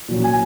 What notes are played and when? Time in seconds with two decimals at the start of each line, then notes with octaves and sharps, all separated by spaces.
0.08 A#2 F#3 C#4
0.24 G#5